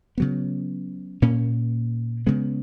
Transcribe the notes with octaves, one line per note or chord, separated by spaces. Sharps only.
C#3 F#3 B3
A#2 A#3 C#4
C#3 G#3 B3